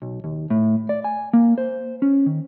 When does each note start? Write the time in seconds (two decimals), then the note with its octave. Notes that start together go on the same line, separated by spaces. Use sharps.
0.02 B1
0.24 D#2
0.50 A2
0.89 D5
1.04 G#5
1.33 A#3
1.58 C5
2.02 C#4
2.26 D#3